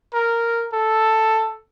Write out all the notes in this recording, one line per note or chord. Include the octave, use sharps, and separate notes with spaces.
A#4
A4